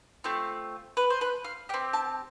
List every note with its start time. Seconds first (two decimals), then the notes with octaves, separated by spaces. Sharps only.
0.24 A3 C4 F4
0.97 B4
1.10 C5
1.21 B4
1.44 F5
1.69 G4 G5
1.74 C4
1.93 A5